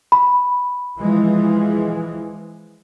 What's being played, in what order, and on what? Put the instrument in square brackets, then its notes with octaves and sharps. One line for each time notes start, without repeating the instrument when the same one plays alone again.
[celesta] B5
[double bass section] E3 F3 G#3